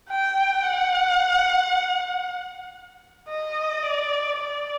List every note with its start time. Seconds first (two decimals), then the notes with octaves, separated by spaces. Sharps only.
0.09 G5
0.63 F#5
3.29 D#5
3.83 D5
4.36 D5